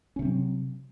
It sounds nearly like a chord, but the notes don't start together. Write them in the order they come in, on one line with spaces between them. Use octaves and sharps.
C#4 C3 C4 F#3